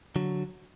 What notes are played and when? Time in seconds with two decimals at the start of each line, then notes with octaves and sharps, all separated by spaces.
0.16 D3 F#3